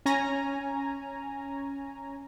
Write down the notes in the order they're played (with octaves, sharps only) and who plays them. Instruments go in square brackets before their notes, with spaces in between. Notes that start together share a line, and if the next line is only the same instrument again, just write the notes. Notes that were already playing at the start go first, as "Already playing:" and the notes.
[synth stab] C#4 G#5 A#5